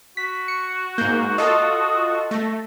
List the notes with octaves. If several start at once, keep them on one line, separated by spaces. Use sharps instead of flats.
F#4 B6
C#6 C#7
G#2 A#3 G6
F4 A4 D#5 D#6
A3 A#6